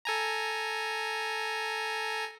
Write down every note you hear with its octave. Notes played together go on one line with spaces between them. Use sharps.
A4 G#5 A#5